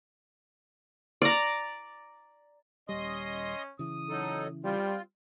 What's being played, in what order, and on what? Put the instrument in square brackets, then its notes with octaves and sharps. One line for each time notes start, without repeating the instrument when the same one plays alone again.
[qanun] D5 A#5
[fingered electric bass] D#1 G3 [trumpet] C#4 [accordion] D#5 C6 D#6
[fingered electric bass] C#3 E3 [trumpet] D#6
[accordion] F#3 D#4 A4
[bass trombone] G3 [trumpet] C4 [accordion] F4